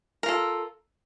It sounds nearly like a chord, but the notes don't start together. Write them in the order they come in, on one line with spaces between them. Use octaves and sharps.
A#4 F4 A4